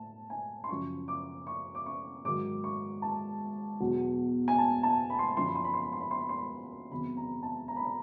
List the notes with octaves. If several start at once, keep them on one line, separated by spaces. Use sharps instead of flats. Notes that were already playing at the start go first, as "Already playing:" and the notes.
Already playing: A2 A5
G#5
C6
F#2 C#3 F3 C#6
D6
C#6
D6
C#6
G#2 D#3 F#3 D6
C#6
A5
E2 B2 F#3
G#5
A5
A5
B5
C6
B5
F#2 D3 F3 C6
B5
C6
B5
C6
B5
C6
B5
C6
B5
C6
B5
E2 C3 D#3 F#3 B5
A#5
A5
A#5
B5
A#5